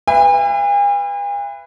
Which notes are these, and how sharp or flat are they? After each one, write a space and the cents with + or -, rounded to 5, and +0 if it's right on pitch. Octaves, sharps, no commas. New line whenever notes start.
B4 +0 E5 +45 G#5 -45